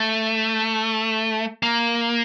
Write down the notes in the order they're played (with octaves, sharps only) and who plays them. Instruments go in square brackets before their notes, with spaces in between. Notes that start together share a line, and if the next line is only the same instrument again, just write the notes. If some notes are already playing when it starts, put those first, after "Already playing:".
Already playing: [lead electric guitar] A3
A#3